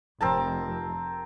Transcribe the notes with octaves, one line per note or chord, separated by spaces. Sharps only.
F1 C4 A#4 A5